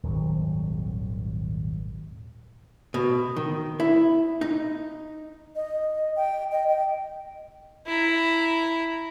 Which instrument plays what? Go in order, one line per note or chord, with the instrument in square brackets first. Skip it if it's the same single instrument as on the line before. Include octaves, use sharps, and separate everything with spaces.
[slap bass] D#1 G#1 F#3
[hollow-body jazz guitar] B2
D#3
E4
D#4
[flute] D#5
G5
D#5
G5
[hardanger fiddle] E4 A#5